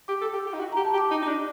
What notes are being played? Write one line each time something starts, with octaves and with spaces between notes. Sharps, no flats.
G4 D6
A4
G4
G4
D#4
F#4
G4 A#5
A5
G4
D6
D#4
D#4
D4